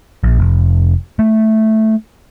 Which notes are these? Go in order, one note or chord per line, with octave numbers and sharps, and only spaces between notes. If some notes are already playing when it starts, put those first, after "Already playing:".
A#1
F1
A3